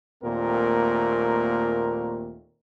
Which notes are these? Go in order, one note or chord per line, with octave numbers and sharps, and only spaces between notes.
D#2 A#2 A3 C4 A#4